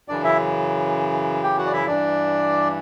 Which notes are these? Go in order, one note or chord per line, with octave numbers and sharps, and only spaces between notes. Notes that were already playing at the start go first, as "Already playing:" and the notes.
F#2 C#3 E3 D4 D5
E4 E5
G4 G5
F#4 F#5
D5
E4 E5
G2 E3 D4 D5